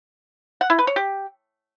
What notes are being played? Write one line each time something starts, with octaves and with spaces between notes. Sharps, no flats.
F#5
E4
B4
C#5
G4